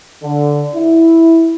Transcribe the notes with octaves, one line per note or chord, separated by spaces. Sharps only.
D3
E4